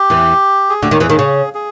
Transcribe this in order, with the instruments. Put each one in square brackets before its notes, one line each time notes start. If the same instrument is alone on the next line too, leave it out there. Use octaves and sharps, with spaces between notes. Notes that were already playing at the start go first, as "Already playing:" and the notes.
Already playing: [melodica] G4
[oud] E2 E3
[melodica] G#4
[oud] D2 D3 [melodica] G4
[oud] D#2 D#3
[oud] E2 E3 [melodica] G#4
[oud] D#2 D#3
C#3
[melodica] G#4